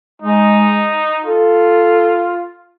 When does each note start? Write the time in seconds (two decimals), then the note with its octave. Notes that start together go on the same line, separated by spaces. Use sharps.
0.22 G#3 D#4
1.24 F4 A4